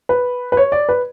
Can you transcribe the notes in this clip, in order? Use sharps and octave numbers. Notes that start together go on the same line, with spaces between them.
B4
B4
C#5
D5
B4